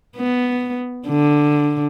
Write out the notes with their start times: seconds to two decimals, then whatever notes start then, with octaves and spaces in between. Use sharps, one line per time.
0.17 B3
1.07 D3